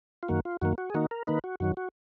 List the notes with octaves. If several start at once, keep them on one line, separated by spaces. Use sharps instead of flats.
F4
F#2 D#3 A#3 F#4
F4
F#2 D#3 A#3 F#4
F#4
G#4
D#3 A#3 D#4 F#4
A#4
D#3 A#3 D#4 B4
F#4
F#2 D#3 F#3 F#4
F#4